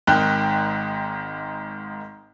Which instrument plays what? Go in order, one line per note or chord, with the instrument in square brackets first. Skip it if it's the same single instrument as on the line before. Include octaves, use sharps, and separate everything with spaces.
[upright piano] G#1 G#2 D#3 G5 F#6